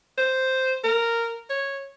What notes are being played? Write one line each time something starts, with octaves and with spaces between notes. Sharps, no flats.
C5
A#4
C#5